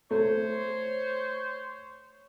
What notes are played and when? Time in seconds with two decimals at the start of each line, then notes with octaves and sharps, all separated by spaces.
0.11 A3 C5 C#5